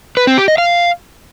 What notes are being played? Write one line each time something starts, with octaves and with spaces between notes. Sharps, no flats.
B4
C4
G4
D#5
F5